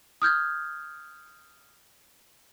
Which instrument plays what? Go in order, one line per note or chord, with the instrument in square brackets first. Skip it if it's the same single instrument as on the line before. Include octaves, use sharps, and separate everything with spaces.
[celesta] D#6 F6 G6 G#6